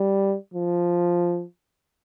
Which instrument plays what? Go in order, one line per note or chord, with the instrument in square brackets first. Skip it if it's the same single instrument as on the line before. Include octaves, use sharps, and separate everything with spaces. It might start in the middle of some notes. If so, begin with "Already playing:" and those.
Already playing: [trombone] G3
F3